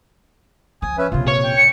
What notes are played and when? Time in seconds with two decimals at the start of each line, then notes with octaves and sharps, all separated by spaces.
0.82 F3 G#5 D#6
0.98 C#4 B4 E5
1.12 A#1 C3 F4
1.28 C#5
1.44 G5
1.57 C#7